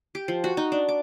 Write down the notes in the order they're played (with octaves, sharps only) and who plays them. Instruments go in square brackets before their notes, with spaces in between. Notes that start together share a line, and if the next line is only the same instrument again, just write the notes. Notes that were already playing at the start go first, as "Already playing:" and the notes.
[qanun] G4
F3
F#4
D#4
D4
D6